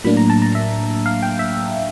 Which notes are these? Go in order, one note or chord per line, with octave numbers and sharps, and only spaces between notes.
A2 F#3 A#3 D4 B5
A#5
A5
A#5
E5
F5
G5
E5